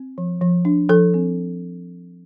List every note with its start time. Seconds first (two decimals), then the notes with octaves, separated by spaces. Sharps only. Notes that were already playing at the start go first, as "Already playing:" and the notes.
Already playing: C4
0.18 F3
0.41 F3
0.65 D4
0.89 F3 A4
1.14 C4